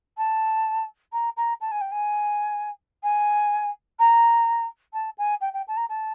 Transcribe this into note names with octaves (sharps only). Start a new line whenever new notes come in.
A5
A#5
A#5
A5
G#5
G5
G#5
G#5
A#5
A5
G#5
G5
G5
A5
A#5
A5